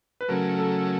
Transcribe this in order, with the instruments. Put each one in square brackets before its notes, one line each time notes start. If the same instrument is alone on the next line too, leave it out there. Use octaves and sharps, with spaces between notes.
[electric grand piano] B4
[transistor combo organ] C#3 F#3 A3 [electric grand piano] A#4
[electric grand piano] A4